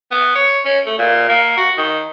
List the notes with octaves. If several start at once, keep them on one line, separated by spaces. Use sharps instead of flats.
B3
C#5
C#4
A3
A#2
A#3
F#4
D#3